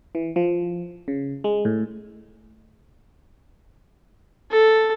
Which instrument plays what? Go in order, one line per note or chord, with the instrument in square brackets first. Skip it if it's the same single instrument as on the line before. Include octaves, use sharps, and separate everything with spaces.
[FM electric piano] E3
F3
C#3
G#3
A2
[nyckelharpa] A4